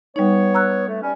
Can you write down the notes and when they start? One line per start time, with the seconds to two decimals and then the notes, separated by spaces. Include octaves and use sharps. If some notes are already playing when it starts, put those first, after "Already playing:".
0.16 G3 B3 D#4 C#5
0.54 A#5 E6 F#6
0.88 A3
1.01 G3 C#4